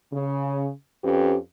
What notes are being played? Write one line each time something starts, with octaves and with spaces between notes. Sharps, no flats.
C#3
F2 C#4 G4 B4